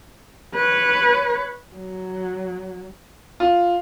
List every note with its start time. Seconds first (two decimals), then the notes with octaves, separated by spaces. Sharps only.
0.55 B4 C#5
1.76 F#3
3.40 F4